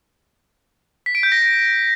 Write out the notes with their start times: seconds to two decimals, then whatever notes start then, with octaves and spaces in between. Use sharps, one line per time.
1.06 B6
1.15 D7
1.23 G6
1.32 A#6